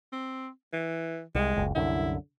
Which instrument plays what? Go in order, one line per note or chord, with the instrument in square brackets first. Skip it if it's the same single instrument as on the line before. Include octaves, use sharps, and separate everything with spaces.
[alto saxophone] C4
E3
[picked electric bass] C2 [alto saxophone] G#3
[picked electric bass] F#1 C#2
[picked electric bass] C2 F#2 D3 [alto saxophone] E4